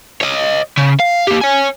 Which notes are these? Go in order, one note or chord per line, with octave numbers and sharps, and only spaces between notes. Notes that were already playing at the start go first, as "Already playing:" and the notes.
C#5 D#5
C#3
F5
A#3 G4
C#5 G#5